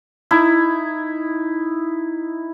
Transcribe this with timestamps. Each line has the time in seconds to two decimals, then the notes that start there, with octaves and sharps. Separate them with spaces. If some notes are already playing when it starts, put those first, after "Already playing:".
0.31 D#4 E4